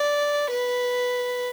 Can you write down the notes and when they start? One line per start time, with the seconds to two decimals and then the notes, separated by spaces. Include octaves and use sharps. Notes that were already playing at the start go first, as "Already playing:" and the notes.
Already playing: D5
0.51 B4